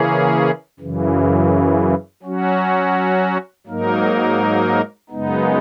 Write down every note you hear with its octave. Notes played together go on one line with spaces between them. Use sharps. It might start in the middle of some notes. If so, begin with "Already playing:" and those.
Already playing: C#3 E3 A#3 C#4 G#4
F#2 C#3 E3
F#3 C#4 F#4
G#2 F#3 A#3 D#4 A#4
F#2 C#3 G#3 B3 D#4